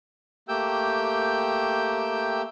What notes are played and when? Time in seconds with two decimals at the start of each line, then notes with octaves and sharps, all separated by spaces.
0.48 A3 A#3 G4 G5 E6 G6